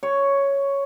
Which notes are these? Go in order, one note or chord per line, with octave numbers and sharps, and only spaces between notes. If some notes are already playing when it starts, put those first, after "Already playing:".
C#5